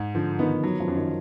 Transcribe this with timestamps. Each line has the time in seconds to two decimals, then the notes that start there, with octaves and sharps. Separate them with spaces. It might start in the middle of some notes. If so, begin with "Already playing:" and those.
Already playing: G#2
0.15 D3 F3
0.39 D#3 B3
0.63 D#3 F#3
0.80 F3
0.88 F#2
0.96 D#3